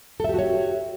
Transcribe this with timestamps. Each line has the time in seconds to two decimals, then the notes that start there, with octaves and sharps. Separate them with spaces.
0.20 A4
0.24 E5
0.29 G4
0.34 F#4
0.39 C#5